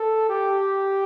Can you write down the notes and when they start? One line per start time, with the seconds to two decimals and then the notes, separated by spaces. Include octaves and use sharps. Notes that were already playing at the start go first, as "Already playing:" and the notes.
Already playing: A4
0.29 G4